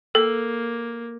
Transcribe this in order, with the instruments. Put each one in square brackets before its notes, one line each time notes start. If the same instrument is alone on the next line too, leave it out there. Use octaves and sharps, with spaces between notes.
[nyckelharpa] A#3 [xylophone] A4